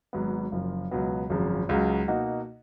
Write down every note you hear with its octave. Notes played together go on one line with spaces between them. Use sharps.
G#1 G#2 F#3 B3
F#1 F#2 F3
C#2 B2 F#3 B3
G#1 F#2 C#3 F3
C#2 C#3 F#3
B2 A#3 D#4 F#4